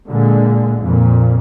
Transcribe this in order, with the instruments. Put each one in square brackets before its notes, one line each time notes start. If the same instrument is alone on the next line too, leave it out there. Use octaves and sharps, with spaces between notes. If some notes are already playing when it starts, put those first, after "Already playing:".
[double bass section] A#2 D3 G#3
F2 A#2